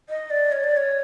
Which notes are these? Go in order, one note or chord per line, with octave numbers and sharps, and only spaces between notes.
D#5
D5
C#5
D5
C#5